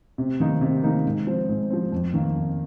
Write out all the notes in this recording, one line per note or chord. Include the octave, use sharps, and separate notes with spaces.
C3
D#3 A#3 D#4
C3
D#3 A#3 D#4
G#2
F3 C4
G#2
F3 C4
F2
D#3 A#3
F2